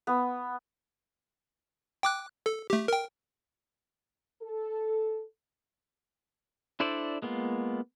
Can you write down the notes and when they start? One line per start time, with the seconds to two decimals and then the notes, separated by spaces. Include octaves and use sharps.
0.07 B3
2.03 G5 D6 F#6
2.46 A4
2.70 A3 G4
2.88 A#4 G5
4.42 A4
6.80 D4 E4 A4 C5 D5
7.22 G#3 A#3 B3 F4